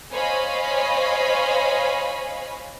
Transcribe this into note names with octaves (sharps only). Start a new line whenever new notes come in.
C5 C#5 D#5 F5 G#5 B5